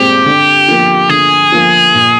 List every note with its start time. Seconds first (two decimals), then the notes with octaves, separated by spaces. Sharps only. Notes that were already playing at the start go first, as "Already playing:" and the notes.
Already playing: A#2 G#3 C4 G4
0.26 D3
0.68 F3 A#3
1.09 D3 G#4
1.52 F3 A#3
1.95 A#2